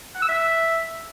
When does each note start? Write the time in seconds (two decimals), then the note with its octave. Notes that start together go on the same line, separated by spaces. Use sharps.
0.15 F#5
0.22 E6
0.29 E5